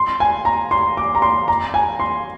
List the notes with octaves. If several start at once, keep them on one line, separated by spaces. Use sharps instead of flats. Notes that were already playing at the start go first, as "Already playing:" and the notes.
Already playing: C6
G#5
A#5
C6
D6
A#5
C6
A#5
G#5
C6